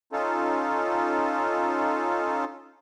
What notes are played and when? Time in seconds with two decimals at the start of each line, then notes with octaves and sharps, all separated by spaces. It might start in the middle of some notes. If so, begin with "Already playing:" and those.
0.13 C#4 D#4 F4 A4